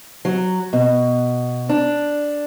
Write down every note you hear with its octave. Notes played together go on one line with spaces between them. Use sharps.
F#3
B2
D4